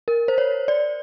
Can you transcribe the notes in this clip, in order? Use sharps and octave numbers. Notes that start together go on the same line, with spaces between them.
A#4
C5
C#5
D5